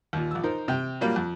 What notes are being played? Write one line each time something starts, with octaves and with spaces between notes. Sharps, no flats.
D#2 A#2
A#1 E6
D#4 A#4 C5
C3 G5
A#2 F#3 G3 A#3
F2